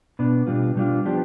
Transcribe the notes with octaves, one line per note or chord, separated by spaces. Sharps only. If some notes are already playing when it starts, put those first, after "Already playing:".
B2 B3 D4
B2 G3 D4 F4
B2 G3 D4 F4
F3 B3 D4 G4